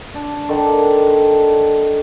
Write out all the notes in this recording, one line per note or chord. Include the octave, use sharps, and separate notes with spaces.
D4
D3 D#3 D4